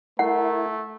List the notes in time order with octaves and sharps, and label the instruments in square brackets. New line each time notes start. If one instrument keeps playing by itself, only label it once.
[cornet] A3 [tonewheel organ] E4 [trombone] A#4 [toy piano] F#5